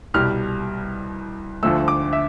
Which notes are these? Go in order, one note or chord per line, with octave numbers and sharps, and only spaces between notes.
C2 B2 G3 F6
D2 D3 F3 A3 E6
D6
E5